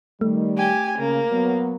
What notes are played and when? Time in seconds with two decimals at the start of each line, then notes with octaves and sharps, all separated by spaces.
0.21 D#3 G3 A3
0.57 G4 G#5
0.98 C#3 A#3
1.31 F#3 B3